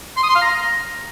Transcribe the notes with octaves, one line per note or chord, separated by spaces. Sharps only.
C6
D#6
C6
F5
A#5